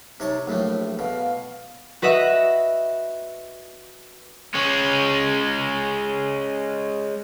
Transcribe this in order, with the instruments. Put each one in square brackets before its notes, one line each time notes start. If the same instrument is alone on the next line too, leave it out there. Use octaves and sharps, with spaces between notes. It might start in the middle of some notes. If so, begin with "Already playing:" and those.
[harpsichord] C3 C#5 A5 [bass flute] D#4
[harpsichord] A#1 A2 A3 [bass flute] F#3
[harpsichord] B2 [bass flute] F5
[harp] F#4 B4 D#5 E5 F#5
[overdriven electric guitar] G#3 C#4